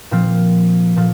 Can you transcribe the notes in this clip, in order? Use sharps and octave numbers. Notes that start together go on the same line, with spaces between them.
A#2 F3 C4 F4
A#2 F3